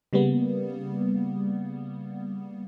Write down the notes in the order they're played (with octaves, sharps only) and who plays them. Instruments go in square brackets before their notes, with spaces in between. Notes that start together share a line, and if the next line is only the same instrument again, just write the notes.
[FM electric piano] C#3 G3 A#3 B3